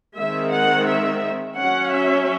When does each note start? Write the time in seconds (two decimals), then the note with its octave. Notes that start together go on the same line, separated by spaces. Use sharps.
0.18 D#3 G#3 C4 E5
0.53 F#5
0.89 E5
1.59 F#3 C#4 F#5
1.95 E5